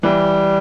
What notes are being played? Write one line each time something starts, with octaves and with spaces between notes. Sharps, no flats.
E3 G3